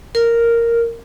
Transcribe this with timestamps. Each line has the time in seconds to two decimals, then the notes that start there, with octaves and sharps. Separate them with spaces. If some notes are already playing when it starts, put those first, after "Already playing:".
0.15 A#4